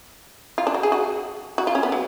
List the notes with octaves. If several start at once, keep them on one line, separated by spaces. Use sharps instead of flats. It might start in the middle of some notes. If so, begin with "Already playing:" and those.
F4
D4
F#4
G#4
F#4
F#4
F4
C#4
B3
F#3